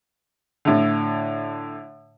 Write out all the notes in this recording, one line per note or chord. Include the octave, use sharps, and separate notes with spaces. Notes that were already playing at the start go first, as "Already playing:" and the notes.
A2 D3